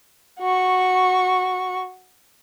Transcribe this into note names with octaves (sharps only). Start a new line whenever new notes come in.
F#4 C#6